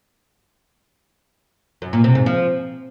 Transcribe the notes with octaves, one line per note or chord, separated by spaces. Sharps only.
F#2
A#2
C3
G#2
F3